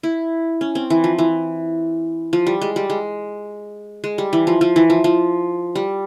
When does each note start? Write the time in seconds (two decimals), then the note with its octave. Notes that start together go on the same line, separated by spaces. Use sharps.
0.03 E4
0.61 C#4
0.75 C4
0.90 E3
1.04 F3
1.18 E3
2.33 F3
2.47 G3
2.62 G#3
2.76 G3
2.90 G#3
4.04 G#3
4.18 G3
4.33 E3
4.47 F3
4.61 F3
4.76 E3
4.90 F3
5.04 F3
5.75 G3